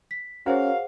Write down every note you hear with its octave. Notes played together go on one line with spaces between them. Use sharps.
B6
C#4 F#4 G#4 A#4 C5 C#5 F5 F#5